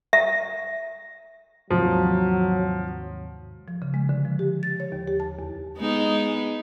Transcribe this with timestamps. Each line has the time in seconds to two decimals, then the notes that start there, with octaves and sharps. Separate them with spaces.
0.13 E5
1.71 D#2 G#2 C3 F3 F#3
3.68 F3
3.82 C#3
3.94 G#3
4.09 D3
4.25 F3
4.39 G4
4.63 A6
4.80 C#5
4.92 D#2
5.08 G4
5.20 A5
5.39 E2
5.78 G#3 B3 D#4